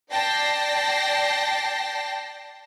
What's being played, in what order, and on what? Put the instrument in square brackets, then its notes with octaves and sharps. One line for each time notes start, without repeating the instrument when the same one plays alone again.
[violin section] D5 G5 A5 A#6 C7